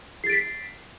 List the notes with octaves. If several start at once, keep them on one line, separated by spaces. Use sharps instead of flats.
A6 B6 C7 D7